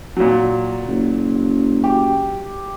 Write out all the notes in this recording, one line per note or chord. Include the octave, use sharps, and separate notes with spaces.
A#2 F#3
F#1
G4